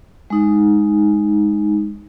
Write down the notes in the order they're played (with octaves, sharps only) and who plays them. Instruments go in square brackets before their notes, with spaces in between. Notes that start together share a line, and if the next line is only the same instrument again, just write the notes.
[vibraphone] G#3 D#4